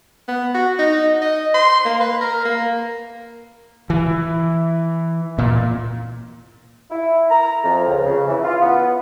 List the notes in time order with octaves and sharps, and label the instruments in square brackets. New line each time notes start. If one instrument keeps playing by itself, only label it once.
[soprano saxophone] B3
F#4
D#4
D#5
C6
A#3
B4
A#4
A#3
[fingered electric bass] E3
A#2
[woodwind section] E4
A#5
F2
C#2
C#3
E3
F4
B3